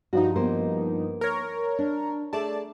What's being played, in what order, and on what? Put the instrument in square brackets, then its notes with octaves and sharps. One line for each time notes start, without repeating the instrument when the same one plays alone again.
[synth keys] G2 F3 D#4 [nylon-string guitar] F#4
[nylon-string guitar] A#3 B3 C5
[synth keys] A#4 C#5
[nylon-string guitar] D4
[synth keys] A3 D5 A5 [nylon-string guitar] G#4